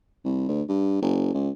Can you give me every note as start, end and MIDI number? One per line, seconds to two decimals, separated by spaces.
0.25 0.47 36
0.48 0.62 38
0.68 0.99 43
1.01 1.33 30
1.34 1.50 37